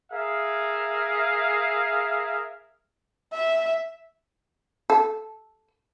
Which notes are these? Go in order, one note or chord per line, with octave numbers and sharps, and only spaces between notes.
G#4 A#4 E5 F5
E5
A4